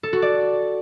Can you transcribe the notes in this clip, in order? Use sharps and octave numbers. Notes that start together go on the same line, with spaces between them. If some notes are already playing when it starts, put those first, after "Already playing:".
A4
F#4
D5